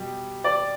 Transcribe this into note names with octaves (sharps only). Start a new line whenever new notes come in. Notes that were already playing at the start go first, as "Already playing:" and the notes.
Already playing: B2 G3
D5